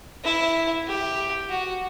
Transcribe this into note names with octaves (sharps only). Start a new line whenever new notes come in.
E4
G4
F#4